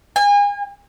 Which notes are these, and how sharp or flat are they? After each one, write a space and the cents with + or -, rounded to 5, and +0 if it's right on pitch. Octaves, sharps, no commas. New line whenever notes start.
G#5 -35